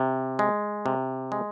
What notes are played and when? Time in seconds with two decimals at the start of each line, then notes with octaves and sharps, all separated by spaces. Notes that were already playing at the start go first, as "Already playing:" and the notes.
Already playing: C3
0.39 G#3
0.86 C3
1.32 G#3